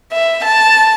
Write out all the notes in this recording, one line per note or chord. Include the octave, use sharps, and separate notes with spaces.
E5
A5